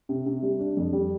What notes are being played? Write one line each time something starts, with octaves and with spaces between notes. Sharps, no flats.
C3
C3
G3
D4
F2
G3